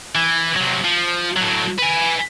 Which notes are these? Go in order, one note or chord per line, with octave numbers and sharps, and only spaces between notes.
E3
C3 F#3
F3
A2 F#3
B4 G#5